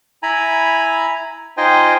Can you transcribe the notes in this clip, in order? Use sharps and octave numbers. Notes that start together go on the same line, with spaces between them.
E4 G#5 A#5 B5
D#4 F4 C5 D#5 G5 G#5